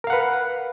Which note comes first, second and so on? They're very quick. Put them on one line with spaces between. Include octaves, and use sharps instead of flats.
A#4 F5 F#5 B4